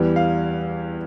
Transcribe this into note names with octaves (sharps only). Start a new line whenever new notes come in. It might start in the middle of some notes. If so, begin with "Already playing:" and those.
Already playing: E2 E3 G3
F5